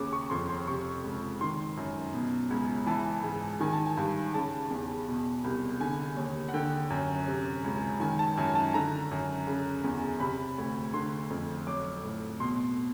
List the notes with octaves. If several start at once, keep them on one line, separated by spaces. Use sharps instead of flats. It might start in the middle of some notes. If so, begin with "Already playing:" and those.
Already playing: D#2 C#3 D6
C#6
F2 C6
C6
C3 C#6
C#2
D#3 C6
F#2
B2
C#2
E3 A5
G#2
D#3 G#5
A5
G#5
G2
C#3 A5
E2
B2
C2
D3 G#5
D#2
F#5
D3 G5
F#2
C3
C#2
D#3 G#5
A5
F#2 G#5
A5
D3 A#5
F#2
C#3
E2
C3 B5
D2
D3 C6
F2
F#3 D6
A2
B2 C6